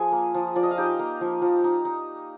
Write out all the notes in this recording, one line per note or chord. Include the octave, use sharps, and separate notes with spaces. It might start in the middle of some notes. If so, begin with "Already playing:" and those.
Already playing: F3 G#4 G#5
A#3
F3
F3 D5
D#5
F5
D#4 G4 G5
A#3
F3
F3
D#4
D#4